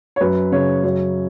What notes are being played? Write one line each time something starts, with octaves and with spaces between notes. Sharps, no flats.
C#5
F#2 B4
C#3 C#5
F#2 C#5